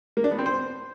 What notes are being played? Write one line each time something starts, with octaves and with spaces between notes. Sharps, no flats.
A#3
D4
B3
C4
C5